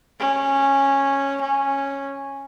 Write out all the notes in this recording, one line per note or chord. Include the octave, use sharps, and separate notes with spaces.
C#4
C#4